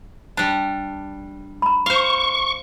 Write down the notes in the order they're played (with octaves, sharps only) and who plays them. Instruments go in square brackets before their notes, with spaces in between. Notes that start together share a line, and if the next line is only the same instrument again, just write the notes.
[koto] G3 D4 [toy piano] A5
[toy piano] A#5 B5
[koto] C5 F5 [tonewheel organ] C#6